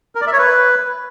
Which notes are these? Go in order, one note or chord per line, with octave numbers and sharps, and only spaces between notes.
A#4
D5
E5
C#5
B4